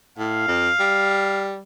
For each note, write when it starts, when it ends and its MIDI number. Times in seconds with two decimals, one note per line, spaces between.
0.18 0.47 45
0.18 1.46 77
0.48 0.70 41
0.80 1.60 55